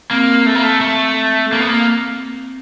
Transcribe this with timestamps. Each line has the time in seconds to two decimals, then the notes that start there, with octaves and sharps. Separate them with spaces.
0.11 A#3 C4
0.46 A3
0.55 A#3
0.63 A3
0.81 A3
1.53 A#3
1.60 B3
1.68 A#3